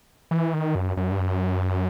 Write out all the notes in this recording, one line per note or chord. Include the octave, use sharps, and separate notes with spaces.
E3
D#3
F#2
F#2
G2
F#2